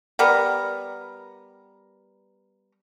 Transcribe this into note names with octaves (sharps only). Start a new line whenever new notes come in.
G3 B3 A#4